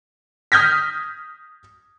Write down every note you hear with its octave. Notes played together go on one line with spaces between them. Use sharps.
D#6 F6 G6 G#6 A#6 B6